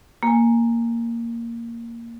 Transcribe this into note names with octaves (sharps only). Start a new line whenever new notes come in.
A#3 G#5